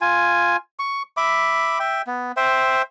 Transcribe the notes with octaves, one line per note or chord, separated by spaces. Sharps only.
F4 G#5
C#6
E5 B5 D6
E5 G5
B3
C5 E5 G5